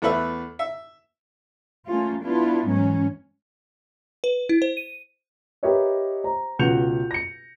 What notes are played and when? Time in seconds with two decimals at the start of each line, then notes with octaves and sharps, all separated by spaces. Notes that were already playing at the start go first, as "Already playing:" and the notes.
0.02 E2 A3 B3 B4 E5 F#6
0.59 E5
1.88 A3 A#3 C#4 F4
2.22 B3 D4 E4 F4
2.69 G#2 E3 F#3 C#4
4.24 B4
4.49 E4
4.62 C5
4.77 D#7
5.63 G4 A#4 B4 C#5 D#5 E5
6.24 C5 A#5
6.59 C#2 B2 F#4 G6 C#7 F7
7.11 A#6 C#7